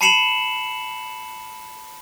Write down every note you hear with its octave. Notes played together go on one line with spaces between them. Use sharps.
A5 B5 C7 C#7 E7 F#7